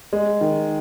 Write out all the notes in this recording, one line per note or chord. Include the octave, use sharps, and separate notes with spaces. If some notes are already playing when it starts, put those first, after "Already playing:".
G#3
D#3